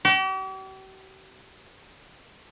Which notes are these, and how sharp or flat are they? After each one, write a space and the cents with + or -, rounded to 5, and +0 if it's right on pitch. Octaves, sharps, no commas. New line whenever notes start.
G4 -45